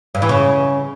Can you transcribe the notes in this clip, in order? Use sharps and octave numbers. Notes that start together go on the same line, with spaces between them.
G2
E3
C#3